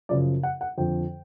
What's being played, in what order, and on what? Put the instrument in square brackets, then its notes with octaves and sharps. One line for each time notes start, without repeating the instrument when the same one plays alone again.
[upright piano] F#2 C#3 F3 D5
F#5
F#5
F2 D3 F3 G5